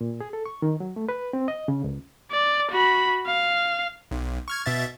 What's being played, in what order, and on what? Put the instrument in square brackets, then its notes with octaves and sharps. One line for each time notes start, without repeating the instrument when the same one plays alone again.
[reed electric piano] A#2
G#4
A4
C#6
D#3
F#3
A3
B4
C4
D#5
C#3
C#2
[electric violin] D5
F#4 B5
F5
[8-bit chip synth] B1
C#6 F6 G#6
B2 E5 A6